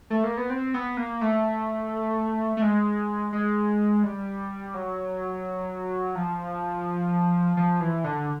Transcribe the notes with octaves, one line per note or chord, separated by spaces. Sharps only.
A3
A#3
B3
C4
B3
A#3
A3
A3
G#3
G#3
G3
F#3
F3
F3
E3
D3